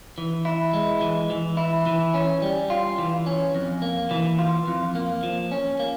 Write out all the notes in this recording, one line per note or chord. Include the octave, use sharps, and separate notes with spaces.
E3
E4
G#3
E3
E3
E4
E3
C#4
G3
F4
E3
C#4
F2
A#3
E3
F4
F2
A#3
F3
C#4
A#3